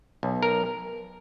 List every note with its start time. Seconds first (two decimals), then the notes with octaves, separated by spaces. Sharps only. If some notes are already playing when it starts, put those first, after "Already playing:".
0.23 B1
0.43 A#4